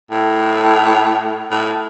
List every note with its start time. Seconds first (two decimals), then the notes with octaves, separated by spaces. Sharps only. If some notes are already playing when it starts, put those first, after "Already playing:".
0.11 A2
1.51 A2